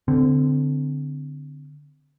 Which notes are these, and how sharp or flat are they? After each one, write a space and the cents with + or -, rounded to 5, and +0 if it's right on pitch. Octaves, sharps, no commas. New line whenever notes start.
D3 -5 C4 -25